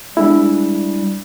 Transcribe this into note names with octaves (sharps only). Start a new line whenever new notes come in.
G3 G#3 D4 E4